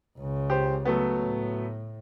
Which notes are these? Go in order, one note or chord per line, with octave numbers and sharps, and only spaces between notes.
C#2 C#3
G4 C5
F#3 A3 B3
A2